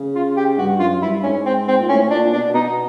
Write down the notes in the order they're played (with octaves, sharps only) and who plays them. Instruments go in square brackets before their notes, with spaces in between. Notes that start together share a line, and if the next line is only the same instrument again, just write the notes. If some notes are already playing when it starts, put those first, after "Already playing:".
Already playing: [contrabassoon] C#3
[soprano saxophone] F4
G4
[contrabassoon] G2 [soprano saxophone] F#4
[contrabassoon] F#2 [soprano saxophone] F4
[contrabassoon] G2 [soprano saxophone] E4
[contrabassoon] G#2 [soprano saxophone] C#4
[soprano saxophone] C4
C4
[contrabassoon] A#2
[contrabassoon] A2 [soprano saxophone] C#4
[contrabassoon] A#2 [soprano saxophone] D4
[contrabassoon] B2 [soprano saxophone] D4
[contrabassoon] B2 [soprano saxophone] D#4